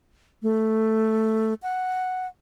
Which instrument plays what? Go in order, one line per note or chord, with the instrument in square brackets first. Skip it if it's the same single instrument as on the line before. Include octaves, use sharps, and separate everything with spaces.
[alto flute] A3
F#5